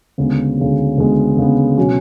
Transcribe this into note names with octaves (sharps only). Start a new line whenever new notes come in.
D2 C#3 G#3 B3
D2 C#3 G#3 B3
D2 C#3 G#3 B3
D2 C#3 G#3 B3
B2 F#3 C#4